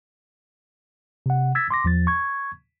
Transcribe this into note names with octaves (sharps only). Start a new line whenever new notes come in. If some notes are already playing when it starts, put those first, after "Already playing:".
C3 F#5
E6 G#6 A6 B6
C6 D6 A#6
E2 F3 A6
C#6 G#6